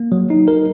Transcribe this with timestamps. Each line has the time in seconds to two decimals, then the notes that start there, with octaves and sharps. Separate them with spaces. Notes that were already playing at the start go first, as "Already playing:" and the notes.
Already playing: A#3
0.12 F#3
0.30 D#4
0.48 A#4